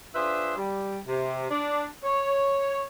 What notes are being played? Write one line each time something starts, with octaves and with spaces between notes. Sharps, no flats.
D4 F4 G#4 B4 C5 E5
G3
C3
D4
C#5